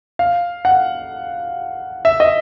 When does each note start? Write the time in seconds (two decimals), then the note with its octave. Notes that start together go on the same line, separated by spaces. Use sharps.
0.19 F5
0.65 F#5
2.05 E5
2.20 D#5